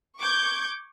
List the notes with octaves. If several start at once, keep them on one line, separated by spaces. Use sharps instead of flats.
C#6 D6 G6 G#6